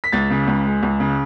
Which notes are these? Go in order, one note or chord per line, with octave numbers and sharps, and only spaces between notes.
B6
C#2 A6
C#3
C#2
G#3
C#2
C#3